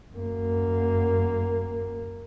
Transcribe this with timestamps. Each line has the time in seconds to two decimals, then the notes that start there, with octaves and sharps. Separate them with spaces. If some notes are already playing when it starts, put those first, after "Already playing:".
0.15 F#2 A#3